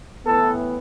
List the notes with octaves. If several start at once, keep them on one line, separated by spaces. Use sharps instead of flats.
A2 E3 B3 A4